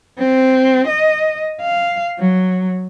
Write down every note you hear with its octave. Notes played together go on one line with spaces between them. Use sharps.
C4
D#5
F5
F#3